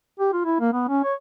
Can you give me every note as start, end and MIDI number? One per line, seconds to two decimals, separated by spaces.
0.20 0.32 67
0.33 0.41 65
0.45 0.59 64
0.61 0.72 58
0.73 0.89 59
0.89 1.02 61
1.04 1.14 73